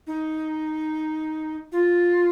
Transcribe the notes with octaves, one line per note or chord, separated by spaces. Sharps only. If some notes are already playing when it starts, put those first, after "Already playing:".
D#4
F4